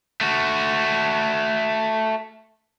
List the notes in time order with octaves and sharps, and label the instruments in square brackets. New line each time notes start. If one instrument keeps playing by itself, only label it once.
[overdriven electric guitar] A3 F#4